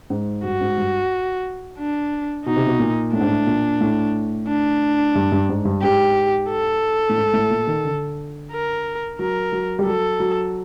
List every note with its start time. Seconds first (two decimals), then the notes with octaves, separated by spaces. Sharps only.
0.10 G#2
0.44 G2 F#4
0.61 G#2
0.78 G2
1.78 D4
2.46 B2 D#4
2.56 C3
2.67 B2
2.80 A#2
3.13 A2 D4
3.21 G#2
3.28 A2
3.47 A#2
3.81 A2
4.48 D4
5.15 G2
5.32 G2
5.49 G#2
5.65 G2
5.82 G#2 G4
6.50 A4
7.09 A2
7.17 G#2
7.33 A2
7.50 A#2
7.67 D#3
7.85 D3
8.52 A#4
9.19 F#3 A#4
9.52 F#3
9.79 G3
9.86 F#3 A4
10.20 F#3